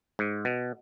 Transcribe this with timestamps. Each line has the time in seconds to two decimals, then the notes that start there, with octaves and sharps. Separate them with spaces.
0.19 G#2
0.45 B2